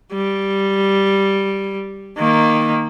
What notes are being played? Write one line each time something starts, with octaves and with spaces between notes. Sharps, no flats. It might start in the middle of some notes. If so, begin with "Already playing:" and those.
G3
D#3 A#3